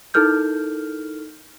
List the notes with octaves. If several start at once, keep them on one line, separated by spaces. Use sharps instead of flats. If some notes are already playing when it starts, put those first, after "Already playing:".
D#4 E4 A4 A#4 F6 G6